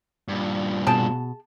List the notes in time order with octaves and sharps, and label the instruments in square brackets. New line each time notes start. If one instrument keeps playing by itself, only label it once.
[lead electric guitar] G2 A#2
[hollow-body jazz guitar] B2 [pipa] G#4 G5 A5